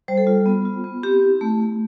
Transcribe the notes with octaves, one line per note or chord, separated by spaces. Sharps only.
G3 C5
A4
F4
B3
F4
B3
C4 G4
E4
A3
A3